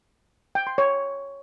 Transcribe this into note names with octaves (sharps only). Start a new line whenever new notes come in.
G5
C6
C#5